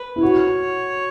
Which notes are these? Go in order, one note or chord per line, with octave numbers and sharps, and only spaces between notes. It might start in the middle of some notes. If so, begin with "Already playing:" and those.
Already playing: B4
E4
F#4 C#5